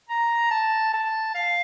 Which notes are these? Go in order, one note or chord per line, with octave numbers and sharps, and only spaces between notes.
A#5
A5
A5
F5